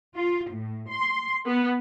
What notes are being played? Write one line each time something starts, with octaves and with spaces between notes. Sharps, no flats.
F4
A2
C6
B3